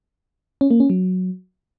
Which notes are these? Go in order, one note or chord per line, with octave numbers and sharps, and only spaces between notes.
C#4
A#3
C#4
F#3